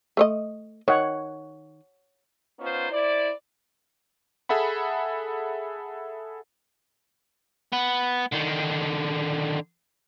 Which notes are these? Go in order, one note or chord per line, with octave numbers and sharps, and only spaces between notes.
A3 C#5 D#5
D#3 C#5 F#5
B3 C#4 D#4 F4 C5
E4 C5 D5
G#4 A4 E5 F#5 B5
B3
D3 D#3